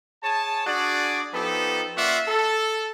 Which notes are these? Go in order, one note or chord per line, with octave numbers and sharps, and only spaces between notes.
G#4 C#5 G#5 A5
D4 F#4 G#4 D5
F3 B3 D#4 G4 A4
A#3 C#4 F4 D5 E5 F#5
A4